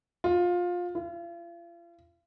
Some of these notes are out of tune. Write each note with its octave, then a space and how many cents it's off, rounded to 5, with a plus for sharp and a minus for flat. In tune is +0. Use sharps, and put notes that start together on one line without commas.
F4 +20
F4 -40